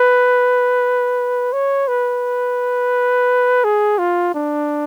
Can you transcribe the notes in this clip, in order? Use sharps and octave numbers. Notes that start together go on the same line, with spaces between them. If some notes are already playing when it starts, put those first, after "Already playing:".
Already playing: B4
C#5
B4
G#4
F4
D4